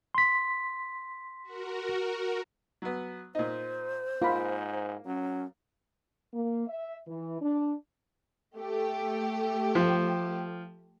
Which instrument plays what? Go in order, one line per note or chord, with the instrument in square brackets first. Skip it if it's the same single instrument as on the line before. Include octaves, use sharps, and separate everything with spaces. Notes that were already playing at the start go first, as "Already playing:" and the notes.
[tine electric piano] C6 B6
[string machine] F#4 A#4
[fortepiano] F#3 B3
[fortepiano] A#2 D#4 [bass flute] C5
[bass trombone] G#2 [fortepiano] A#3 [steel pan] F4 B5
[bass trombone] F#3 [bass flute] C#4
[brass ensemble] A#3
E5
E3
D4
[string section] A3 G4
[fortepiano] F3